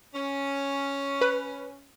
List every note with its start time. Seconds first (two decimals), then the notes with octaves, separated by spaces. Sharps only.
0.14 C#4
1.21 B4